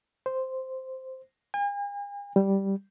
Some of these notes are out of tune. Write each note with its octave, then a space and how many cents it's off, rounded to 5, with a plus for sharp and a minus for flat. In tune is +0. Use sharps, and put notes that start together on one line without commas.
C5 -5
G#5 -45
G3 -5